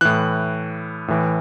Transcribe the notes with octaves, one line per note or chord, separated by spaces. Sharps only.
A2 E3 F#6
A2 E3